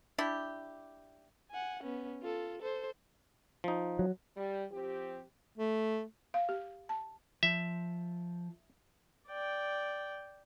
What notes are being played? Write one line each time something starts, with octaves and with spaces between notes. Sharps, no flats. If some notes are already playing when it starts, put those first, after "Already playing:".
D4 E4 G4
F#5 G#5
B3 C#4
F4 A4
A4 C5
F3 D#4
F#3
G3
F3 C4 G4
A3
F5
G4
A5
F3 E5
D5 G5